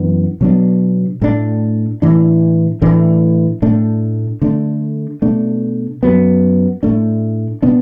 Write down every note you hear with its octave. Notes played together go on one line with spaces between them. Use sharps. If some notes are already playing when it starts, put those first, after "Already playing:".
Already playing: F#2 E3 B3 D4
B2 F#3 B3 D4
A2 A3 D4
A2 E3 D4
A2 E3 A3 D4
A2 A3 D4
D3 A3 D4
B2 A3 D4
F#2 F#3 B3
A2 A3 D4
B2 B3 D4